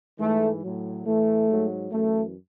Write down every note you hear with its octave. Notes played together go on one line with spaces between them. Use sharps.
G#2 E3 A3
A2 F#3
A2 E3 A3
G#2 F#3
F#2 E3 A3